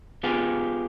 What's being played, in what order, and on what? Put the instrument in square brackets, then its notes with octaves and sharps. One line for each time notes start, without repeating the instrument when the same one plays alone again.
[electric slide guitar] B3 F4 G4 G#4